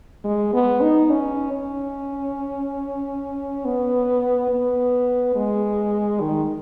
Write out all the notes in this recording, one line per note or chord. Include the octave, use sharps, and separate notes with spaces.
G#3
B3
D#4
C#4
C#4
B3
B3
G#3
D#3